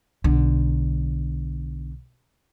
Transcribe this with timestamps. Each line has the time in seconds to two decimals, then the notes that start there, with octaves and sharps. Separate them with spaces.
0.24 B1 D3